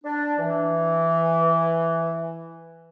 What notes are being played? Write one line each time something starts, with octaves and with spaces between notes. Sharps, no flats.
D4
E3